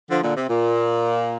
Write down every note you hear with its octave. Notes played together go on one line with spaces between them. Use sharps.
D3 F3
A#2 D3
C3
A#2